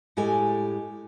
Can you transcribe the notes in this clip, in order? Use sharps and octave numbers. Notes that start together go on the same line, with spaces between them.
A2 G#3 G4 A4 G#5